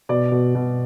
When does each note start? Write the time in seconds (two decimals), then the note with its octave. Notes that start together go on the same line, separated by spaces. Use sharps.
0.09 B2 D5
0.32 B2
0.55 B2